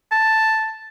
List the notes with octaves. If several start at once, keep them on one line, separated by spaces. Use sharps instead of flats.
A5